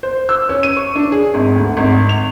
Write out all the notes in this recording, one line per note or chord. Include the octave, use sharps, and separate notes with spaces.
C5
E6
C#4
D#7
C#6
D4
G#4
G#1
D2
G#1
F7